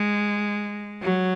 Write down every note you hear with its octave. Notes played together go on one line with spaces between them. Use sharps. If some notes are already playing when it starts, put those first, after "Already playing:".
Already playing: G#3
F#3